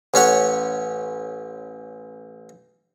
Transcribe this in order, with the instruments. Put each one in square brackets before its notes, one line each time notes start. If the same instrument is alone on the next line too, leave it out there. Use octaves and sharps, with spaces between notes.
[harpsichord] A1 C#4 C#5 F#5